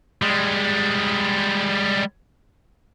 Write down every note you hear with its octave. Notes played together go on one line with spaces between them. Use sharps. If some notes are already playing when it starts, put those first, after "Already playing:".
G3 G#3